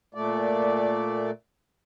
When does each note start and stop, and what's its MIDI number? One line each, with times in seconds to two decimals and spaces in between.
0.14 1.31 46
0.14 1.31 57
0.14 1.31 74